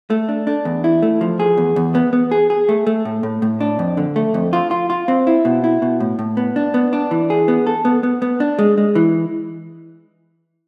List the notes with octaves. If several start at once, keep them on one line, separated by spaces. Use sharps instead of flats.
A3
D4
D4
E2
E4
A3
F3
G#4
E2
E2
B3
B3
G#4
G#4
A3
A3
A2
A2
A2
D4
F2
D3
A3
F2
F4
F4
F4
C4
E4
B2
E4
B2
A2
A2
B3
D4
B3
D4
E3
G#4
B3
A4
B3
B3
B3
D4
G#3
G#3
E3